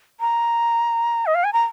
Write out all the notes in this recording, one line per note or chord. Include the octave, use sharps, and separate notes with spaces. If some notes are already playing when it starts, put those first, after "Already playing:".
A#5
D#5
F5
G#5
A#5